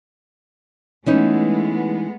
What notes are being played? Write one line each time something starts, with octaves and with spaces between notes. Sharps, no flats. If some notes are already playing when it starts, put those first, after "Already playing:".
E3 G#3 A3 B3 C#4 D#4